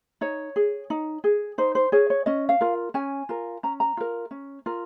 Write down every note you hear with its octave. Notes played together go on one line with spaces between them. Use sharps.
D#4 C#5
G#4
D#4
G#4
D#4 C5
C5
G#4 C#5
C#5
C#4 D#5
F5
F4 A#4
C#4 G#5
F4 A#4
C#4 A#5
A#5
F4 A#4
C#4
F4 A#4